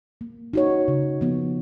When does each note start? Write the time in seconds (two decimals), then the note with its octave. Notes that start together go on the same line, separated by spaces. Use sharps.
0.21 A#3
0.53 D#4 F#4 C#5
0.88 C#3
1.21 F3 B3